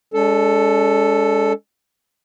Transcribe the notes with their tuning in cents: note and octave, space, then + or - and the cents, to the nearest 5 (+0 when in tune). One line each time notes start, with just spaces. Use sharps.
G#3 -20 C#4 +45 A4 +5